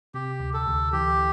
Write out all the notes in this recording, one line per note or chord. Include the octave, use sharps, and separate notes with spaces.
C3 G4
D2
A4
D2
E3 G4